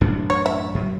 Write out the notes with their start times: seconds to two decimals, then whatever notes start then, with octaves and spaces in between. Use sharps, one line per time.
0.01 A1 F#2 D4
0.30 C#5
0.46 E5
0.75 F#2